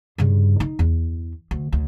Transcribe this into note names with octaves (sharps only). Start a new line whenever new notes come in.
G2 C#3
D#4
E2
D2
D2